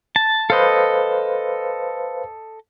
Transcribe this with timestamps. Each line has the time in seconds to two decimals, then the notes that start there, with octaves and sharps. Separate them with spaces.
0.16 A5
0.50 A4 B4 C5 D#5 F5